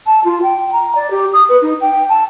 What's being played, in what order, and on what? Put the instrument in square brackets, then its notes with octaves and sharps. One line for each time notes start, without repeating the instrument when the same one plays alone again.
[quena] A5
F4
G5
A#5
D5
G4
D#6
B4
D#4
G5
A5